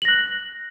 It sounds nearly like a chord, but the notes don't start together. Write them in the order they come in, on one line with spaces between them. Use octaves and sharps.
F#7 A#6 F#6